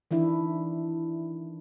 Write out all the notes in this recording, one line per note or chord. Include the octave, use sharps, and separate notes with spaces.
D#3 E3 D4 E4